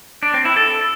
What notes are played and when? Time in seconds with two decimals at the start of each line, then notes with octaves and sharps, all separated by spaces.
0.23 D4
0.34 C4
0.45 E4
0.56 A4